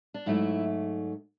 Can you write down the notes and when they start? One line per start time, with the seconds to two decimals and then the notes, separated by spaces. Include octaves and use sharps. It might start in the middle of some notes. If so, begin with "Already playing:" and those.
0.14 D4
0.26 G#2 F#3 A3 E4